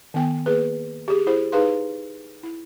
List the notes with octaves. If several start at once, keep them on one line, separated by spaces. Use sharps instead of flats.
D#3 B3 G5 G#5
A#3 G#4 B4
G4 G#4
E4 G#4 C5
D#4 G#4 B4 F5 C6
E4